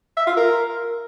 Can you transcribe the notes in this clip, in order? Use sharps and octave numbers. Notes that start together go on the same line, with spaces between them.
E5
F4
A#4